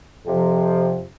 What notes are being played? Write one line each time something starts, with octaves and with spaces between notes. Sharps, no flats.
F2 C3 F3